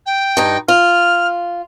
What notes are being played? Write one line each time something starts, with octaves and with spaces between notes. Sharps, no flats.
G5
G2 D#4
F4 F6